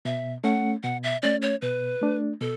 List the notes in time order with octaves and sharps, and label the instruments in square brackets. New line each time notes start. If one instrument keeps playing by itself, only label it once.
[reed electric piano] B2 [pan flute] E5
[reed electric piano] A3 C#4 [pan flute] F#5
[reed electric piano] B2 [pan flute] F#5
[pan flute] E5
[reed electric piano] A3 C#4 [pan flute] D5
[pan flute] C#5
[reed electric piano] B2 [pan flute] B4
[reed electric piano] A3 D4
[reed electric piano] B2 [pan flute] A4